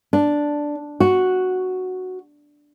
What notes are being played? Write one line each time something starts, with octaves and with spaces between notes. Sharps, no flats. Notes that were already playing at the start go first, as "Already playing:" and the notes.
D4
F#4